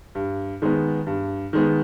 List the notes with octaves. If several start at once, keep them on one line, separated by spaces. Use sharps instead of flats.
G2
D#3 G#3 B3
G2
D#3 G#3 B3